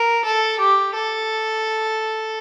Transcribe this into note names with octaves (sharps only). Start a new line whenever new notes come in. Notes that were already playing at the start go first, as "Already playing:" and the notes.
Already playing: A#4
A4
G4
A4